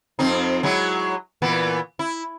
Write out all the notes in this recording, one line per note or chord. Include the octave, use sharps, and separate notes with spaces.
F2 C4 D#4
F#3 G#3 E4
A#2 E3 B3
E4